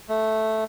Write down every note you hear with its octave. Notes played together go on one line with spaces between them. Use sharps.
A3